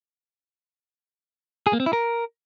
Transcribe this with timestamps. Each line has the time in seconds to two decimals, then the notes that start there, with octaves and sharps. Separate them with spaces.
1.67 G#4
1.73 A#3
1.80 C4
1.86 E4
1.93 A#4